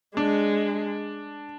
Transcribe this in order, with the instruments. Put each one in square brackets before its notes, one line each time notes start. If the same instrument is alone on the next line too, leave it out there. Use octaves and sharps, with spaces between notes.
[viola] G#3 [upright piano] D4